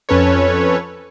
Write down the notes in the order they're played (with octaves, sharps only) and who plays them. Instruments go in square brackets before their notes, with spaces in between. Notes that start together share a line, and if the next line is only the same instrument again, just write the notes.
[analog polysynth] F2 C#4 A4 B4 C#5